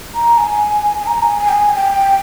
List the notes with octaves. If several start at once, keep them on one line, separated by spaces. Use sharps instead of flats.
A#5
G#5
G#5
A#5
G#5
G#5
G5
G#5
G5